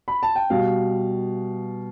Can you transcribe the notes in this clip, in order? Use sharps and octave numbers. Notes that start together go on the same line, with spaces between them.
B5
A5
G5
B2 G3 F5